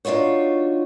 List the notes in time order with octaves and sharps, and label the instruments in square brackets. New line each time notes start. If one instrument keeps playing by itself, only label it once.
[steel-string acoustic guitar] D4 D#4 F4 F#4 C#5